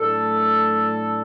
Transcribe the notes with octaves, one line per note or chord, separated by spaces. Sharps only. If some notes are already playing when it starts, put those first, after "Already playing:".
Already playing: A2 F#3 A3 D4 A4